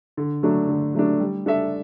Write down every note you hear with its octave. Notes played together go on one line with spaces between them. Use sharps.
D3
F#3 A3 D4
D3
F#3 A3 D4
G3
D4 A4 E5